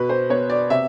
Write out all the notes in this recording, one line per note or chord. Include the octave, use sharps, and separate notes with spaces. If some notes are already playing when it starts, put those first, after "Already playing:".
Already playing: B2 B4
C5
B3 C#5
D5
C3 E5